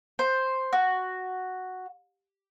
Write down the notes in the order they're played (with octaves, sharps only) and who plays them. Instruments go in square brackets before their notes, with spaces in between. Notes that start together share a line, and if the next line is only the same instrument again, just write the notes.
[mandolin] C5
F#4